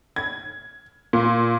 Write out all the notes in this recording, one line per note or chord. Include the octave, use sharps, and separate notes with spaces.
G#6
A#2